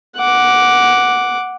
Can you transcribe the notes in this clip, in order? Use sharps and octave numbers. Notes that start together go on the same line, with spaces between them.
F#5 D6